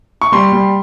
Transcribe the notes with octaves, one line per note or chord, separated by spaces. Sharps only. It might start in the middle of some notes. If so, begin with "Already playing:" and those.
C#6
G3 C6
G3